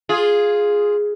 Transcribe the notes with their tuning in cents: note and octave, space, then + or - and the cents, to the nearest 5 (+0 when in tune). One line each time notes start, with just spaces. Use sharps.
F4 +0 G#4 +0